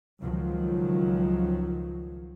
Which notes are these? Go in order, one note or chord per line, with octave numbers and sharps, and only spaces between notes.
C#2 D#3 F3 F#3